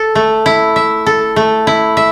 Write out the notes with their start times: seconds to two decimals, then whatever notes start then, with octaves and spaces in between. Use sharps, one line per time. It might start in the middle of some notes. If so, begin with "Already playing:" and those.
Already playing: A4
0.15 A3
0.46 E4
0.76 E5
1.06 A4
1.36 A3
1.67 E4
1.97 E5